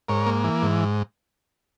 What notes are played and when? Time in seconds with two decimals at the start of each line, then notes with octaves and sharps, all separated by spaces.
0.09 G#2 A#4 C#5
0.26 A#3
0.44 E3
0.62 G#2